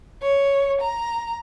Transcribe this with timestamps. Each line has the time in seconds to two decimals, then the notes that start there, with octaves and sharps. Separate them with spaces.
0.21 C#5
0.80 A#5